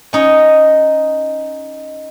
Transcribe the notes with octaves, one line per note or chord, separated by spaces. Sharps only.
C#4 D#4 C#5